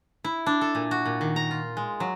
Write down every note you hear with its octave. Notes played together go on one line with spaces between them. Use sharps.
E4
D4
A4
A#2
F#4
A#2
D#3
A#5
F4
G#3
F#3